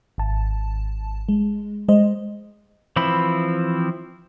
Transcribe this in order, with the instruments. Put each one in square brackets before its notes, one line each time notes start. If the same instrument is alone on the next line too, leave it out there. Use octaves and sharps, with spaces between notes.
[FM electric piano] G#1 A5
G#3
G#3 C5 D#5
[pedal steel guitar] E3 F3 C4 E4 B5